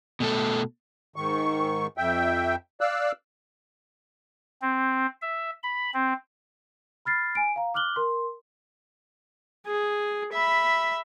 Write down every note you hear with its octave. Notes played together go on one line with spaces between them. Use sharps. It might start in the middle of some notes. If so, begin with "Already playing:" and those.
B2 A3 A4
G#2 D#3 C#6
F2 E5 G5
D5 F5 E6 F#6
C4
E5
B5
C4
B5 F6 A6 C7
G#5 D7
F5 A#5
D6 F6 F#6 F#7 G7
A#4 C6
G#4
E5 B5